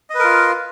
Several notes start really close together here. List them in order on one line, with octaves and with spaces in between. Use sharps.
D#5 B4 A#4 F4